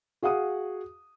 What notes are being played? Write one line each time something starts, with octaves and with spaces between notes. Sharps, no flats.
F#4 G#4 F5 F#5 D#6